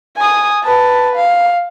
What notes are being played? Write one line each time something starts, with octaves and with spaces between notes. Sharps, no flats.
G#5 D#6
B4 A5
F5